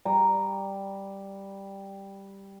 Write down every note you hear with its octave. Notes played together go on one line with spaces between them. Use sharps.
G3 A#5